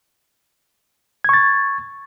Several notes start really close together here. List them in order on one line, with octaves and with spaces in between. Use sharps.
G#6 C#6 A6